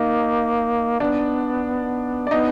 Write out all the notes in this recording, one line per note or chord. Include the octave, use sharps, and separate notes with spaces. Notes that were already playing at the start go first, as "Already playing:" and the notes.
Already playing: A#3 D#4 D#5
B3 D4 D5
D5
B3 D#4 D#5